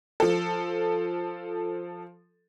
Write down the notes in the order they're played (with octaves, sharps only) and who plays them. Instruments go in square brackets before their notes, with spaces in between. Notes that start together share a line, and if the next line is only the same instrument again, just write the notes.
[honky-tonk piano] F3 A4